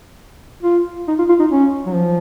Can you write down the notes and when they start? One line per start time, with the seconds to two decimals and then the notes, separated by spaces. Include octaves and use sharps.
0.63 F4
1.08 D#4
1.19 F4
1.29 F4
1.40 D#4
1.52 C#4
1.86 F#3
1.95 F3